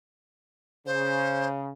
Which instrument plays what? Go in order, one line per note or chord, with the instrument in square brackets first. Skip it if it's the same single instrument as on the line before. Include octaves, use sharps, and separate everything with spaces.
[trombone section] C#3 [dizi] C5